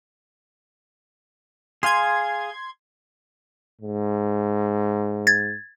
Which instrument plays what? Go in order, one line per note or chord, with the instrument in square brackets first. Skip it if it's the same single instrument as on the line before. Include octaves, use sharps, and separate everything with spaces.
[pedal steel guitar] G#4 F5 G#5 [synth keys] C6 G#6
[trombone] G#2
[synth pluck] G#6 A6